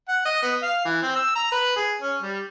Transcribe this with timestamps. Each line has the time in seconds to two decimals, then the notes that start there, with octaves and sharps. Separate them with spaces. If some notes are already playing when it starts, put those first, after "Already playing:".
0.08 F#5
0.25 D#5
0.42 B3
0.62 F5
0.85 E3
1.02 C4
1.16 E6
1.35 A#5
1.52 B4
1.76 G#4
2.02 C#4
2.21 G3